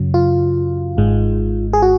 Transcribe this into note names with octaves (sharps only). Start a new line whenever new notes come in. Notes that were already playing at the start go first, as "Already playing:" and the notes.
Already playing: F#2 C#3 F#3
F4
G#1 G#2 G#3
G#4
F#4